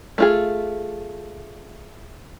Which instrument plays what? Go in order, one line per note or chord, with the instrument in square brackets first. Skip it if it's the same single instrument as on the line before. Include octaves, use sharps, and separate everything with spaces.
[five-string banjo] A3 F4 G#4